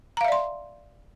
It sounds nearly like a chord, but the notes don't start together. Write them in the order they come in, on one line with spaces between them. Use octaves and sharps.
A#5 F5 E5 D5 C6